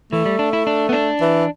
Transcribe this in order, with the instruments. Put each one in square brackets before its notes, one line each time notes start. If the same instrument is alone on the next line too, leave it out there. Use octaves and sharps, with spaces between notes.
[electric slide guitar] E3 [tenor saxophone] A3
[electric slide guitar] G3
D4
E4
D4
B3
D4
[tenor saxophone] E3